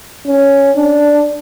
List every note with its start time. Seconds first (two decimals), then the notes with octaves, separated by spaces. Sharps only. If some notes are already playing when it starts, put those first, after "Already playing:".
0.27 C#4
0.76 D4